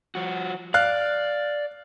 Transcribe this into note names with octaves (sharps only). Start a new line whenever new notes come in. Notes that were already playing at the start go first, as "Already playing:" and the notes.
F3 F#4
D5 F5 F6 F#6